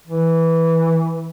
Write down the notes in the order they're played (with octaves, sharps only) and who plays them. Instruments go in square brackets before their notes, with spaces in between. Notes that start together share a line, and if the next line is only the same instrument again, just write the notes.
[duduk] E3